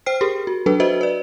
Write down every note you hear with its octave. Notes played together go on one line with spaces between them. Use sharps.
C5 G5 F6 C7
G4 G#4 A#4
F#4
F#3 D4 A4 B4
F#4 B4 C5 D#5 E5
B4 D5